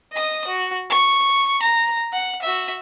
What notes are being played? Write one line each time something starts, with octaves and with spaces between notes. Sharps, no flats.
D#5 D#6
F#4
C#6
A#5
F#5
F#4 E5